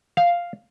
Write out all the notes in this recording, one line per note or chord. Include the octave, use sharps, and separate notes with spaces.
F5